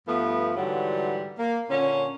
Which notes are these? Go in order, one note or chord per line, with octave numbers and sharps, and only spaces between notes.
G2 F3 A3 B3
G#2 D3 E3 F#3 G3
A#3
A#2 D3 C#4